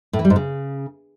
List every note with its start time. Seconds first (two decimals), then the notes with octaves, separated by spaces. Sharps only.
0.13 A2
0.19 E3
0.25 G3
0.30 G#2
0.36 C#3